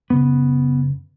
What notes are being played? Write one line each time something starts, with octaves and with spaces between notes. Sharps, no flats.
F#2 C#3 B3